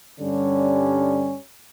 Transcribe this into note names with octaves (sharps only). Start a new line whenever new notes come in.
G2 D3 G3 C#4